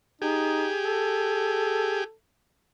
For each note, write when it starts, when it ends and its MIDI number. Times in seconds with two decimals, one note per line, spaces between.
0.22 0.70 63
0.22 2.04 67
0.22 2.04 68
0.84 2.13 69